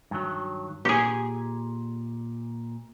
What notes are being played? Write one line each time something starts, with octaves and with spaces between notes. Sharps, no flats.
G2 D#3 F#3
A#2 G4 G#4